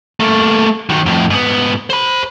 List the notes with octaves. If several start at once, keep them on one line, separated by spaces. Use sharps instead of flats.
A3 A#3
D#3 F#3
F2 A2
G#2 B3
C5 B5